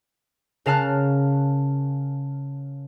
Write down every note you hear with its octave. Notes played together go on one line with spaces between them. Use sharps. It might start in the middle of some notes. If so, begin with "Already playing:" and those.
C#3 A#4 F5 A5 F6 F#6